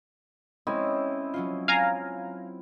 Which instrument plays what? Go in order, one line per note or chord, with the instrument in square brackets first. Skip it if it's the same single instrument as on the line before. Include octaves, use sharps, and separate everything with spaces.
[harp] G#3 C#4 [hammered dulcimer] C4 E4 D#5
[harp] F#3 C#4 F4
[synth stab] F5 G#5 A#5 [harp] D7